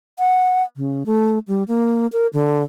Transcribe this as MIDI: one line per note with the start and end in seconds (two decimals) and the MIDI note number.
0.19 0.63 78
0.76 1.03 49
1.06 1.39 57
1.48 1.63 55
1.68 2.07 58
2.13 2.27 70
2.33 2.62 50